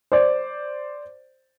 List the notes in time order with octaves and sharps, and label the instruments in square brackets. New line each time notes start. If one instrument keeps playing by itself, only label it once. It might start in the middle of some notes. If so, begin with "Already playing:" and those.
[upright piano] C5 D5